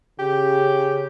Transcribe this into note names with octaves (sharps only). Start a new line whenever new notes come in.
C#3 G4